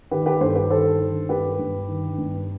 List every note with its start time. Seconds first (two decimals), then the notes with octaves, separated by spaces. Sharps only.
0.11 D#3 G4 B4
0.26 G4 B4
0.41 G2 A4 C5
0.55 G4 B4
0.70 D#3 A4 C5
1.00 D#3
1.29 G2 G4 B4
1.59 G2
1.88 D#3
2.18 G2